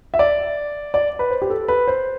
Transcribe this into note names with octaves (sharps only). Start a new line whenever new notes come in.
E5
D5
D5
B4
C5
G4
A4
B4
C5